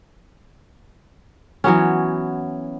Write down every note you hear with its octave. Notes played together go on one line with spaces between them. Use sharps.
E3 F#3 B3 C#4